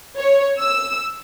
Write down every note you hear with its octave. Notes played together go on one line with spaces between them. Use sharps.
C#5
E6